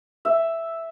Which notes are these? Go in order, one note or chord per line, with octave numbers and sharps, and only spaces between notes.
E5